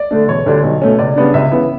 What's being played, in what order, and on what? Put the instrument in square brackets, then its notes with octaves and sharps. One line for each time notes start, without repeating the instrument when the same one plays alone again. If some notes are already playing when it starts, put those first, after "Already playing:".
Already playing: [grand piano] D5
D3 A3 D4
E1 C#5
D2 D3 G3 D4
B1
B2 A3 C#4
C#2 D5
C#3 G3 B3 D4
C#2 E5
C#3 E3 B3